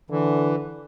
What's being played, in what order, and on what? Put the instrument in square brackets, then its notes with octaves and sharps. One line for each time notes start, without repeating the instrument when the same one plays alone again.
[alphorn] D3 [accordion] E3